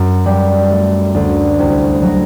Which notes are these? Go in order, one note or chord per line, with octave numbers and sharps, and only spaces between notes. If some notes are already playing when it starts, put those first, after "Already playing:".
Already playing: F#2
G3
A3
D2
C2
F#3